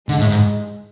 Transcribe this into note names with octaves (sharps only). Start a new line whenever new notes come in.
D3 G#3
A2
G#2